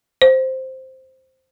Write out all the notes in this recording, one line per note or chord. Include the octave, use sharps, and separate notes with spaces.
C5